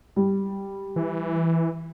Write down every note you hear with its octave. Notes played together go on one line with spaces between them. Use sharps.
G3
E3